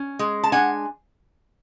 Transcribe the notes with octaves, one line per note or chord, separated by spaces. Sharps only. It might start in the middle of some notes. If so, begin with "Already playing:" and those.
Already playing: C#4
G#3
A5
D4 F#5 G#5